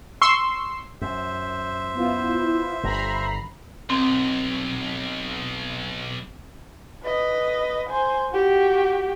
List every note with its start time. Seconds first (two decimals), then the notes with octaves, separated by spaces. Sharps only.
0.22 C6 C#6 E6 C7
1.01 F#2 C5 E5
1.95 B3 E4 F4
2.83 G1 D3 A#5 B5 C7
3.90 B1 C4
7.03 B4 D#5
7.90 C5 G#5
8.32 F#4 G4